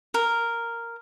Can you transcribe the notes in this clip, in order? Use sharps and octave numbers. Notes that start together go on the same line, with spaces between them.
A#4